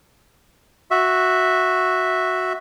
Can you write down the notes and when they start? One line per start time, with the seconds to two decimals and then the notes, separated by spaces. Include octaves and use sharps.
0.91 F#4 E5